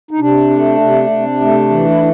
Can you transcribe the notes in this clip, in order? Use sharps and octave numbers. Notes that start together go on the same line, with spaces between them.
D#4
C3 D4
A3
C3
C3
A3
E3
E4